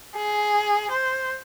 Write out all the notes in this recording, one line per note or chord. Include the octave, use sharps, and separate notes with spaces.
G#4
C5